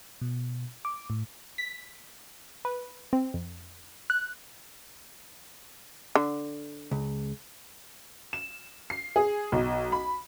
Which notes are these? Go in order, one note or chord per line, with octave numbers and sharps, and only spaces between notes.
B2
D6
A2
B6
B4
C4
F2
F#6
D3
C#2
E7
C7
G#4
B1
B5